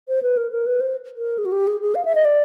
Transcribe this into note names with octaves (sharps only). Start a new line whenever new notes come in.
C5
B4
A#4
A#4
B4
C5
A#4
G#4
F#4
G4
G#4
G#4
F5
E5
D#5
D5